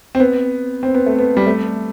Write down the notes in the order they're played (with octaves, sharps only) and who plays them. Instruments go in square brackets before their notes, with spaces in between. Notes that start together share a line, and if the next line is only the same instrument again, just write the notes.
[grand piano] C4
B3
C4
B3
A3
B3
G3
A3